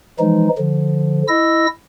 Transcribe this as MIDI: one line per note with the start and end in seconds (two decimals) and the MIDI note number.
0.19 0.48 52
0.19 0.48 53
0.19 0.48 56
0.19 0.48 63
0.58 1.23 50
0.58 1.23 53
1.28 1.66 64
1.28 1.66 75
1.28 1.66 88
1.28 1.66 94